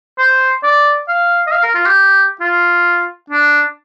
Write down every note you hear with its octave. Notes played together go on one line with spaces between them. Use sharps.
C5
D5
F5
D#5
F5
A#4
F4
G4
F4
D4